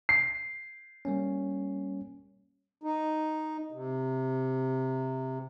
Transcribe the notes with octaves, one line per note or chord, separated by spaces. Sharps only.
C7
G3 A#3 C#4
D#4
C3